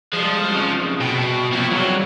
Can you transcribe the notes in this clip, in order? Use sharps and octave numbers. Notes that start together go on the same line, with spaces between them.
F3 G3 G#3
F2 C#3
C2 B2 G5
F3 C4 E4 F#4
G2 C#3 F3 F#3